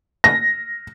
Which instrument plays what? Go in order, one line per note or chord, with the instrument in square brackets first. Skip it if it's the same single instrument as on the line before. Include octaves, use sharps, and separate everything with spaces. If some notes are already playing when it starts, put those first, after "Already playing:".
[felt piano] A#6